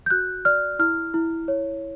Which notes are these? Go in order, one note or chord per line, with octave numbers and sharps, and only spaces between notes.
G6
F#4 F#6
D5 F6
E4 F6
E4
C#5